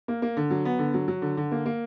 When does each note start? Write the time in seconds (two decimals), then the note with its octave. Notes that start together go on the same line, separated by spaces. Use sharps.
0.08 A#3
0.22 A#3
0.37 D3
0.51 F#3
0.65 B3
0.79 D3
0.94 F#3
1.08 F#3
1.22 D3
1.37 D3
1.51 A#3
1.66 A#3